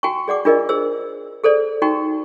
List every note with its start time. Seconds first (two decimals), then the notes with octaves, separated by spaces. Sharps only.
0.03 F#4 G5 G#5 A#5 C#6
0.28 G#4 D5 F#5 D6
0.45 D4 F4 G#4 A#4 D5 D#5
0.69 G#4 C5 E6
1.44 G#4 A4 C5 D5
1.82 D#4 F#4 G5 A#5 C#6